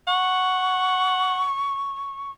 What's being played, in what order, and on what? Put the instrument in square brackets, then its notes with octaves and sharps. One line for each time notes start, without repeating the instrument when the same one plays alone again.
[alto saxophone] F#5 [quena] C#6